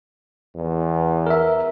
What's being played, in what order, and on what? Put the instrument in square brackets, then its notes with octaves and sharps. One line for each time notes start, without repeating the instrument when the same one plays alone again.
[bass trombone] E2
[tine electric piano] A#4 E5